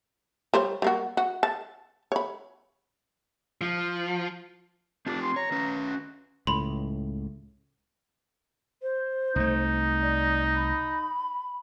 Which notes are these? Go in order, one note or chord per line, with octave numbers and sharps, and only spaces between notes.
G3 C5 C#5
G3 A#3 F#4
F#4
A5
C#5 B5
F3
C4 D4 F4 G4
C6
C#5 A#5
C#4 B4
F#4
C#2 A2 B5 C6
C5
C2 A3 D#4
D5
B5